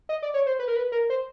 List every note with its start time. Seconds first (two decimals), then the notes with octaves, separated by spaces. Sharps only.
0.09 D#5
0.22 D5
0.34 C#5
0.46 C5
0.59 B4
0.68 A#4
0.76 B4
0.92 A#4
1.10 C5